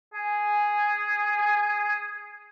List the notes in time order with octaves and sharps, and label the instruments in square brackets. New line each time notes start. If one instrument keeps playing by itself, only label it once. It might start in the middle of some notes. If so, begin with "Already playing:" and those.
[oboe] G#4 [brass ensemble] G#5